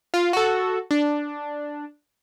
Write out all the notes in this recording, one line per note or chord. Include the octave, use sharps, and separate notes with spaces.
F4
F#4 A4
D4